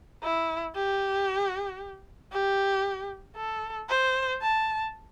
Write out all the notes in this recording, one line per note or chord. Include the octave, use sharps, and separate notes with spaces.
E4
G4
G4
A4
C5
A5